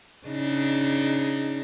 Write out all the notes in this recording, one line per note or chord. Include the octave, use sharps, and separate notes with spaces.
C#3 D4 D#4